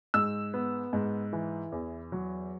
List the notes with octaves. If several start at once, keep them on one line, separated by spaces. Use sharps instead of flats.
G#2 E6
B3
G#2
E3
E2
F#3